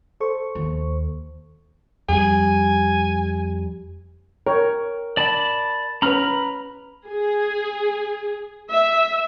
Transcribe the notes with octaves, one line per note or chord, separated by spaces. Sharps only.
A4 C5 C#6
D#2
F2 G3 G#5
A#4 C#5 G5
D5 A5 B5
C#4 B4 A#5 B5 F6
G#4
E5